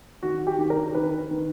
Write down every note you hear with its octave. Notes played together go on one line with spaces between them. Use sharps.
D#3 F#4
G4
D#3
A#4
D#3 B4
D#3